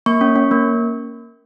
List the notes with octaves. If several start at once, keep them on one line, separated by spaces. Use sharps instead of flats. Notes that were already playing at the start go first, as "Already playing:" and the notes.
A#3 C#6
C#4
C#4
A#3